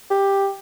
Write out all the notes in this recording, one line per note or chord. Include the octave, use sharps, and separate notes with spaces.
G4